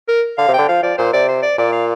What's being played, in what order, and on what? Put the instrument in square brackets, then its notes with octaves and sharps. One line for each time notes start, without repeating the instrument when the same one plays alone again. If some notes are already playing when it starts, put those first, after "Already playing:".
[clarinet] A#4
[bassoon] D3 [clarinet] F5
[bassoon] C3
[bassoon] D3 [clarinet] G5
[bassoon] F3 [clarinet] F5
[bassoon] F3 [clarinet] D5
[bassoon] A#2 [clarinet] C5
[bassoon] C3 [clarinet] D5
[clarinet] C5
D5
[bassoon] A#2 [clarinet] D5
[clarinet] F5